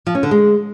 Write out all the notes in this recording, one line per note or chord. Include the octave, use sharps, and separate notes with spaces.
F3
C#4
D3
G#3